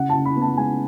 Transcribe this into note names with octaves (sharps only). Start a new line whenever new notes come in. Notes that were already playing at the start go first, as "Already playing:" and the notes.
Already playing: C#3 F#5
A5
C#3
B5
B3
A5
G#3 G#5